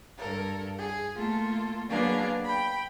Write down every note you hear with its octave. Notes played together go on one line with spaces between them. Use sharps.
G2 A4 A#4
G#4
A3 A#3 F4 A4
F#3 A#3 B3 D4 G#4 F5
G5 B5